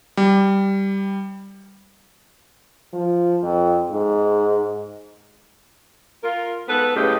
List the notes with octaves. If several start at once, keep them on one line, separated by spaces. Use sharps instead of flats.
G3
F3
F2
G#2
F4 A#4
G#2 B3 A4 B4
F#2 A2 C#3 G#3 A3 G4